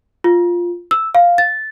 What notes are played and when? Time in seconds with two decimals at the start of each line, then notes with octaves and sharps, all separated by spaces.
0.24 F4
0.91 E6
1.15 F5
1.38 A6